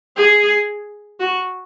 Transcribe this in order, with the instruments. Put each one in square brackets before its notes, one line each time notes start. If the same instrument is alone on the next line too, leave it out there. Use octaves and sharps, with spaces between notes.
[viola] G#4
F#4